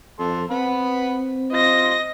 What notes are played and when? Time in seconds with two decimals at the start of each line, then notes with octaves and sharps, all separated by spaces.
0.20 F2 A4 C6
0.51 C4 B4 F#5 B5
1.52 F4 C5 D#5 A#6